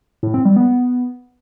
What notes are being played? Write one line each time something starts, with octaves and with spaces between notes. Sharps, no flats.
A2
C4
G3
B3